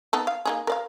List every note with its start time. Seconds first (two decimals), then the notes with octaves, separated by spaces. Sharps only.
0.13 B3 D#4 A4
0.27 F5
0.45 A#3 D#4 G#4
0.67 A#4 D5 F5